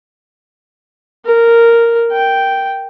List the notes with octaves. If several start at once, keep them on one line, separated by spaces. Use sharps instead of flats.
A#4
G5